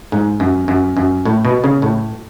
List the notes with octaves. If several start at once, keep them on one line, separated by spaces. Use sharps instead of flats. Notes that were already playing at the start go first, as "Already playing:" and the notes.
G#2
F#2
F#2
F#2
A2
B2
C#3
A2